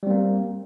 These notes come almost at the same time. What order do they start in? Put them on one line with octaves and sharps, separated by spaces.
G3 C4 A#3